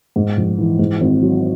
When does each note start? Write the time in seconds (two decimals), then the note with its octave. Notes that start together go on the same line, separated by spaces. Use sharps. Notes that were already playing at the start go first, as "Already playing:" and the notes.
0.16 G#2
0.37 A#1
0.58 E3
0.79 G#2
1.00 G#1
1.22 F#3